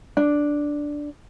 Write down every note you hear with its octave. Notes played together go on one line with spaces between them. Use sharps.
D4